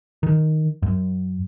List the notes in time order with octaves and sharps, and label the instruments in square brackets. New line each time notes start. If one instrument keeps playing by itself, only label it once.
[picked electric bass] D#3
F#2